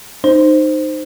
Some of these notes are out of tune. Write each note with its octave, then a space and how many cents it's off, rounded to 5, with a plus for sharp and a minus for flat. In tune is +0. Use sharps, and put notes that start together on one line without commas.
D#4 -20 C5 +0